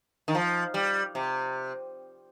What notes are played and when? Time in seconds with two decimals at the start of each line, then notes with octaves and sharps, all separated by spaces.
0.28 D#3
0.35 F3
0.74 G3
1.15 C3